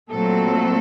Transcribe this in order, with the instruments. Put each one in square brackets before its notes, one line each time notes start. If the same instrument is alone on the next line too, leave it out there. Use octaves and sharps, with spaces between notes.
[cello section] A#2 F#3 A3 C4 A4